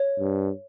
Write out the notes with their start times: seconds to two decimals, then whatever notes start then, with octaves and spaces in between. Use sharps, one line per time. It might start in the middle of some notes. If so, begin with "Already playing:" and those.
Already playing: C#5
0.19 G2